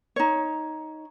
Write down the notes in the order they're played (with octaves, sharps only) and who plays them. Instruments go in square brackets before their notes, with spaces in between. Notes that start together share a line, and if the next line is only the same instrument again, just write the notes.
[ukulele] D#4 C#5